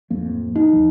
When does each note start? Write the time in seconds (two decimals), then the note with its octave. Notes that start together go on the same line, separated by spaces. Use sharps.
0.10 D1 F2 A#3
0.56 D#4
0.73 D#2 F3